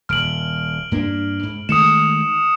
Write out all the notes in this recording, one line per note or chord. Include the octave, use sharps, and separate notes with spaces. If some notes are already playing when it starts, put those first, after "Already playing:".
D#1 F6 D7 F#7
G2 A#3 D4
G#2
D#3 G#3 A3 D#6 C#7 E7